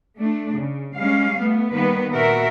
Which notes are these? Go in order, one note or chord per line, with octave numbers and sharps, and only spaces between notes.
A3 D4
C#3
G3 G#3 C#4 F5
A3 B3
D#3 G3 A#3 B3 B4
A#2 B3 F#4 A#4 E5